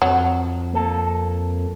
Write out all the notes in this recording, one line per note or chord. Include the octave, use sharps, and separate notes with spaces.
F2 F#3
A#3 A4